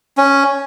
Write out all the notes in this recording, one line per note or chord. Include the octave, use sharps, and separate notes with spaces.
C#4